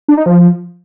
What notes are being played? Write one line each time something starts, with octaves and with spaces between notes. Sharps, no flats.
D4
D#4
F3